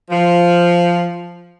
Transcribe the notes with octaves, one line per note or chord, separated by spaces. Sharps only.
F3